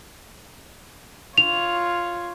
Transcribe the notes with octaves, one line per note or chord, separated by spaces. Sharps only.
F4 C#5 F7